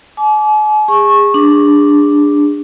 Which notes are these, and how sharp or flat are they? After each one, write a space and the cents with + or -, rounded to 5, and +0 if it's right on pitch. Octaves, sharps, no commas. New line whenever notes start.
G#5 +45 D6 -20
G#4 -30 C#6 -20
D4 +0 G#4 -30